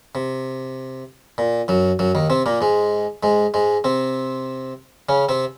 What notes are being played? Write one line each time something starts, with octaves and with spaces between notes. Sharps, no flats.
C3
A#2
F#2 F#3
F#2 F#3
D#2 D#3
C3 C4
A#2 A#3
G#2 G#3
G#2 G#3
G#2 G#3
C3 C4
C#3 C#4
C3 C4